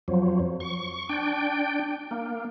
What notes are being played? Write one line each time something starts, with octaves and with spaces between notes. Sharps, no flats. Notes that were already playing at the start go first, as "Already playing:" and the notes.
F2 F3 F#3
C#6
D4 G5
A#3